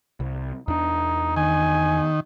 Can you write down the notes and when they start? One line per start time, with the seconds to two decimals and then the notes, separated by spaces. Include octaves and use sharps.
0.20 C2
0.68 E2 D4 D#4
1.36 D#3 G#5